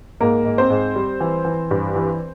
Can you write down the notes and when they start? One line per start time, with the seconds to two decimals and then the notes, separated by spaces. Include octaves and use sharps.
0.20 G#2 A#3 A#4
0.45 G#2
0.58 C4 C5
0.70 G#2
0.96 G3
1.20 E3
1.45 E3
1.71 G2
1.95 E3